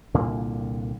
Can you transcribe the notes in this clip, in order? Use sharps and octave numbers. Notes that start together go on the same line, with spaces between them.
C2 A#2 D3 A#3